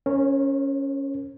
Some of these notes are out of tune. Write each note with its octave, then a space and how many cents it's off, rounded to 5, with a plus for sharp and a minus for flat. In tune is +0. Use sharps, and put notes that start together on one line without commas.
C#4 +0 A#4 +0 C#5 -45